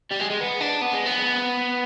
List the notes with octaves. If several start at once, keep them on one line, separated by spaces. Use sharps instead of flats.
G3
G#3
G#3
B3
D4
B3
G#3
B3